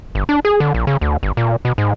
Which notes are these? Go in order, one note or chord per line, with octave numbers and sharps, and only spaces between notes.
G1
D4
G#4
D3
A#1
C#3
D2
G1
A#2
B2
G#2